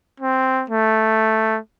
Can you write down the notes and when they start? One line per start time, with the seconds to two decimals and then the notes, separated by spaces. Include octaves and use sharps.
0.20 C4
0.70 A3